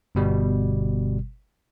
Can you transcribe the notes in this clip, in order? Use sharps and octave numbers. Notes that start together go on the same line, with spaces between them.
G1 B2 G3